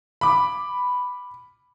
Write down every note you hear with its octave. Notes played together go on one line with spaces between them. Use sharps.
B5 D6